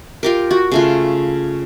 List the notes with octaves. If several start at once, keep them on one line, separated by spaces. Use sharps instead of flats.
F4 G4 A#4
F#4
C#3 A3 F4